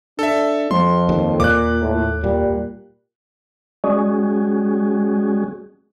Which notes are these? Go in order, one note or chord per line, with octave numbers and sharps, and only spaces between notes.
D4 A4 E5
F2 F3 C6
D#2
D#2 A#2 D6 F#6
A2
A#2 G3
G3 G#3 C#4 F#4 G#4